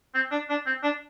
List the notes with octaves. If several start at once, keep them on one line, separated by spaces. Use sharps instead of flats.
C4
D4
D4
C4
D4